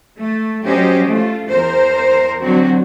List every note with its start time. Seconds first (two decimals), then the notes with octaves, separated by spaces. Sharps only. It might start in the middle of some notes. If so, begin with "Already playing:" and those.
0.17 A3
0.65 F#3 C#4 G4 C5 D#5
1.06 A3 F4
1.50 E2 A#4 C5
2.42 D3 F#3 C4 F#4